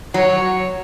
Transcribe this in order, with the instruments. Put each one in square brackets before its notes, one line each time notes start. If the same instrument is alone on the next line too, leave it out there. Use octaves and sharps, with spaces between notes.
[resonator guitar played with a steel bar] F#3 [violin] C#5